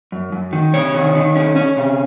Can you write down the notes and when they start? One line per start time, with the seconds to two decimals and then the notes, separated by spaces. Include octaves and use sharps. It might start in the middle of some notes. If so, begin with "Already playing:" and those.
0.12 F#2
0.32 F#2
0.53 D#3
0.74 C3 C#5
0.95 D#3
1.15 D#3
1.36 C#4
1.56 C#4
1.77 C3